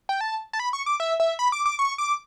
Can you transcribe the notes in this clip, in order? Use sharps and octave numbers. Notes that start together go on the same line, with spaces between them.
G5
A5
A5
B5
C#6
D6
E5
E5
B5
D6
D6
C#6
D6